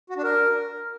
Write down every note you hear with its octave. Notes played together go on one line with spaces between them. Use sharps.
F#4
D4
A#4